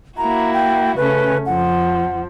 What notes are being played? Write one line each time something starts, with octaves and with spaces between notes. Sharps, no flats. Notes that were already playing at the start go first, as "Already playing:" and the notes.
A#3 E4 F#4 A#5
G5
C#3 A3 C#4 B4
F2 F3 F#5